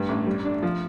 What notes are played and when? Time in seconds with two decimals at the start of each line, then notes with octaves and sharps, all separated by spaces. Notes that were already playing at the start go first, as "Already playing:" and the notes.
Already playing: G2
0.09 A1
0.27 G3
0.45 D4
0.62 F3